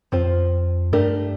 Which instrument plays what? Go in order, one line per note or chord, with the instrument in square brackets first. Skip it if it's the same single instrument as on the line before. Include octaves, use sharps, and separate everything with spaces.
[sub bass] F2 [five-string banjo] F3 C4 F4 C5
[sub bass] G2 [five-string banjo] A3 D4 G4 A#4